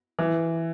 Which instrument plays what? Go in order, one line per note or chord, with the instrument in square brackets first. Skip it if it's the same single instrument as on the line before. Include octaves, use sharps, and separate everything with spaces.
[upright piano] E3